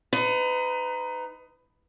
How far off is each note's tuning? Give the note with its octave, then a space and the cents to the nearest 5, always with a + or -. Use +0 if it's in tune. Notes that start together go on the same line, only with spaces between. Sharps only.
D#4 +0 B4 +35